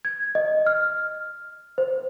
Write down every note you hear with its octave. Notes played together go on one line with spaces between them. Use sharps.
G#6
D#5
F6
C5